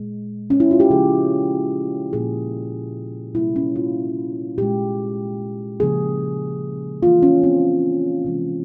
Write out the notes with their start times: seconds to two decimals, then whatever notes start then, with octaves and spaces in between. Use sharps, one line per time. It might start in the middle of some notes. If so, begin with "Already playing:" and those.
Already playing: A#2 G#3
0.50 C#4
0.60 E4
0.71 F4
0.80 G4
0.90 C#3 F3 G#3 G#4
2.13 A#2 F3 A#3 G#4
3.35 C3 G3 A#3 E4
3.56 C#4
3.76 F4
4.58 A#2 G#3 G4
5.80 C#3 F3 A#3 G#4
7.03 C#3 E3 A#3 F4
7.22 C#4
7.44 C4
8.24 C3 E3 G#3